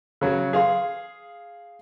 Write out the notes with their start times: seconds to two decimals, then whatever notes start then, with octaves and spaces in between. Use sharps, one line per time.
0.21 C#3 F#3
0.53 G#4 F5 C6